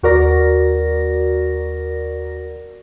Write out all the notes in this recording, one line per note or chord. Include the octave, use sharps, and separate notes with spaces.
D#2 F#4 A#4 D5 A#6